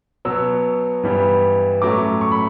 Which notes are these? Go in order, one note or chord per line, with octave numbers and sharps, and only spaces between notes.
B2 F#3 B3 E6
G2 E3 G3 B3
A2 F#3 A3 C#4 D6
C#6
B5